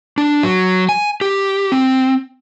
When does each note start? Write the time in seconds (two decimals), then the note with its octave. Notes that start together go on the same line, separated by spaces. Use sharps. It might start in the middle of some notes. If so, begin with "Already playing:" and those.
0.18 D4
0.43 F#3
0.89 G#5
1.21 G4
1.72 C4